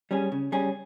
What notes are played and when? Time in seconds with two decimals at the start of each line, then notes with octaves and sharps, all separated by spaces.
0.11 G3 C#4 G#4
0.32 C#3
0.52 G3 C#4 G#4